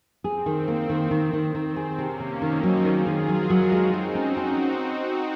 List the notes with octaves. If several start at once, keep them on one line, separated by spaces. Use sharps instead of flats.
C4 G#4
D#3
A#3
D#3
D#3
D#3
D#3 C4
G#4
C3 A#3 C#4
C3
D#3 C4 D#4
F#3
D#3 F4 G#4
D#3
F#3 F#4 A#4
F#3
G#3 C4 D#4
G#3
C#4 D#4 F#4
C#4